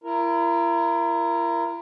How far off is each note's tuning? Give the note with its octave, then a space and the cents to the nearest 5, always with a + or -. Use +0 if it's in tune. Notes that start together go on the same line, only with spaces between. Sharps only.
E4 +40 A#4 +0